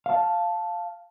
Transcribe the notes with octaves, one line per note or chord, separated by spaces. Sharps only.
F5 A5